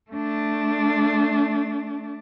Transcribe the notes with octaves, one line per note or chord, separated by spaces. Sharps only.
A3 D4